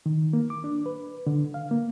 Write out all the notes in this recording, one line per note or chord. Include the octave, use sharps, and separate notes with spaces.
D#3
A#3
D6
D4
B4
D3
F5
A#3